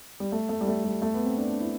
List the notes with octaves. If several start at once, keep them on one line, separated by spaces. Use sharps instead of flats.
G3
A3
A3
G3
A3
G3
A3
B3
C4
D4
D4
E4